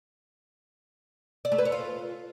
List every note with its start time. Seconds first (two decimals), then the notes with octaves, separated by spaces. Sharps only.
1.45 D5
1.52 A3
1.59 B4
1.65 C#5
1.72 F4